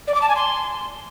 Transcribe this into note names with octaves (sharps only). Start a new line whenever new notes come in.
D5
D6
A5
G#5
C6